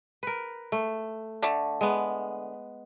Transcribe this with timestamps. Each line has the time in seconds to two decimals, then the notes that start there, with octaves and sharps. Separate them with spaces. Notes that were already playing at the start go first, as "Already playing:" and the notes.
0.23 A#4 B4
0.72 A3
1.42 D3 A3
1.81 G#3 B3